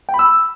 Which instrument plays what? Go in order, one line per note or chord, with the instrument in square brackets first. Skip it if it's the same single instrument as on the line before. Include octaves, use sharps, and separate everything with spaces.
[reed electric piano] G5
B5
E6